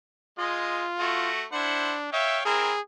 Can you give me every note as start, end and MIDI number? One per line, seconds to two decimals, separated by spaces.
0.39 0.84 56
0.39 1.31 65
0.39 0.84 75
0.99 1.43 57
0.99 1.43 66
1.52 2.08 62
1.52 1.94 64
1.52 1.94 72
1.52 1.94 78
2.13 2.43 73
2.13 2.39 76
2.13 2.43 77
2.13 2.43 79
2.46 2.72 60
2.46 2.72 64
2.46 2.81 68
2.46 2.72 70